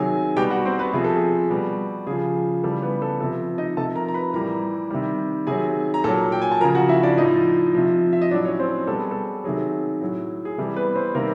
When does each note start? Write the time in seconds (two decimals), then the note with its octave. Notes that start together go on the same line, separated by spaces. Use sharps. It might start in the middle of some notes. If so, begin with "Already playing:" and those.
Already playing: C3 D#3 F#3 G#4 G#5
0.36 B2 G3 G4 G5
0.51 F#4 F#5
0.65 C4 C5
0.79 B3 B4
0.93 C3 F3 G#4
1.04 A4
1.16 G#4
1.50 B2 G3
2.07 C#3 F3 G#4
2.63 C#3 E3 G3 A4
2.82 B3 B4
3.02 A4
3.20 F3 A4
3.23 C3
3.58 D#4 D#5
3.77 C3 A4 A5
3.81 F3
3.96 A#4 A#5
4.08 A#5
4.14 B4 B5
4.33 A2 E3 G3 A#4 A#5
4.91 C3 D#3 G3
5.47 C3 D#3 F#3 G#4 G#5
5.94 A#5
6.04 A#2 F#3 A4 A5
6.32 G5
6.42 G#5
6.52 A5
6.61 F3 A#4 A#5
6.64 C#3
6.75 F#4 F#5
6.89 E4 E5
7.03 D4 D5
7.17 A2 F3 D#4 D#5
7.75 C3 F3
8.13 E5
8.22 D#5
8.31 A2 F#3 D4 D5
8.45 C#4 C#5
8.59 C4 C5
8.87 B2 G3 A4
9.00 G#4
9.11 A4
9.44 C3 D#3 F#3 G#4
10.02 A2 F#3
10.45 G#4
10.58 C3 E3 G3 A4
10.76 B3 B4
10.96 C4 C5
11.14 C3 D#3 G3 A#3 A#4